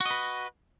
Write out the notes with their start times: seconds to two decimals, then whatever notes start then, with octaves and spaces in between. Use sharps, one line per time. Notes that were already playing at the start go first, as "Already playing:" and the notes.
0.01 F#4
0.06 D#5
0.11 B4